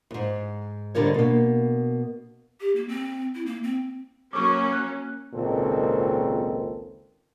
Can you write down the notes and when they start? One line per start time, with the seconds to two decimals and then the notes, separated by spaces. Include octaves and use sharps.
0.11 F2 G#2
0.95 G#2 D3 G3 A#4 C#5
1.14 B2 A#3
2.60 G4
2.76 A#3
2.88 C4
3.35 E4
3.46 A#3
3.63 C4
4.33 F#3 A#3 C#4 C#6 D6
4.73 F#6
5.34 G#1 C#2 A#2 D#3 C4 A4